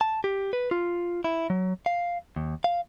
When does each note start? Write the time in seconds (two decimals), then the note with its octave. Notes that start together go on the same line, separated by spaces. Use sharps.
0.01 A5
0.24 G4
0.53 B4
0.71 F4
1.24 E4
1.50 F#3
1.86 F5
2.36 D#2
2.64 F5